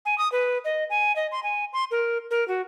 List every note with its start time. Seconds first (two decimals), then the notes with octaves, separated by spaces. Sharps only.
0.05 G#5
0.18 D#6
0.32 B4
0.65 D#5
0.90 G#5
1.16 D#5
1.32 C6
1.43 G#5
1.73 C6
1.91 A#4
2.31 A#4
2.48 F#4